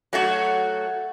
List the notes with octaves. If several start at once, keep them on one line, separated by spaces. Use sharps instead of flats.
F#3 A3 F#4